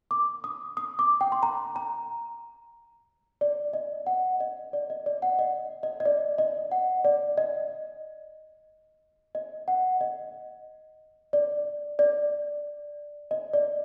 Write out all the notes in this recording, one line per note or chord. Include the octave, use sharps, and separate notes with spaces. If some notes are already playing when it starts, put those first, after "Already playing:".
D6
D#6
D#6
D6
G5
C6
A#5
A#5
D5
D#5
F#5
D#5
D5
D#5
D5
F#5
D#5
D#5
D#5
D5
D#5
F#5
D5
D#5
D#5
F#5
D#5
D5
D5
D#5
D5